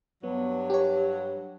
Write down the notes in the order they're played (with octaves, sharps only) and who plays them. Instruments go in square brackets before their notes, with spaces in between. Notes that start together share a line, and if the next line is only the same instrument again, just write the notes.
[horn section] G2 F#3 [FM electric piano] B3
[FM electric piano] G4 C#5